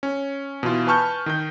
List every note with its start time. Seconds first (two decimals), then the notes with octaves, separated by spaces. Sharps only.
0.03 C#4
0.63 B2 E3 F4
0.87 B4 G#5 A5 C#6 F6 G6
1.26 D#3 D#4 G6